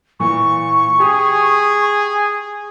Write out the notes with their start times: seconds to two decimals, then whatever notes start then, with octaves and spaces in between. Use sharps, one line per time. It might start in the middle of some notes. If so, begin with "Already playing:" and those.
0.20 A#2 E3 C#6
1.00 G4 G#4 D#6